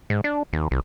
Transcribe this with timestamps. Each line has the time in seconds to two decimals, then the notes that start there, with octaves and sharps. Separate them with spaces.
0.10 G#2
0.24 D4
0.53 D#2
0.71 C2